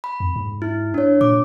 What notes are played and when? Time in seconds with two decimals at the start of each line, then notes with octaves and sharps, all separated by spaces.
0.04 B5
0.20 F2
0.36 G#2
0.62 E4
0.94 D4 C#5
1.21 A#2 D6